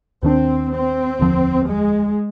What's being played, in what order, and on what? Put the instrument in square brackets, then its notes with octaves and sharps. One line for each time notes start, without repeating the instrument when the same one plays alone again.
[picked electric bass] D#2 D#3 G#3 D4 [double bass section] C4
[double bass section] C4
[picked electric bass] F1 D#2 D3 F3
[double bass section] G#3